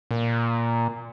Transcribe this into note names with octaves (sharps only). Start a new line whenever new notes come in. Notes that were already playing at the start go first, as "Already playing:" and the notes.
A#2